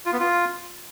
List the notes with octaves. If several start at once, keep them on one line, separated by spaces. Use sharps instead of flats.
F4
B3
F4